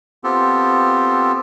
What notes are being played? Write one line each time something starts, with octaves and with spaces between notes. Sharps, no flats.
B3 C4 F4 G4 A4